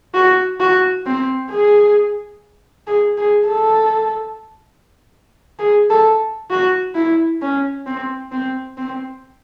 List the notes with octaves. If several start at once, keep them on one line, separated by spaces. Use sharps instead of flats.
F#4
F#4
C4
G#4
G#4
G#4
A4
G#4
A4
F#4
E4
C#4
C4
C4
C4